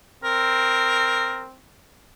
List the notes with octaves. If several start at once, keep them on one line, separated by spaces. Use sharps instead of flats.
C4 A#4